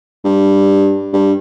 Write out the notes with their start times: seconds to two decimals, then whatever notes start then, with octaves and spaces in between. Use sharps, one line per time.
0.25 G2
1.13 G2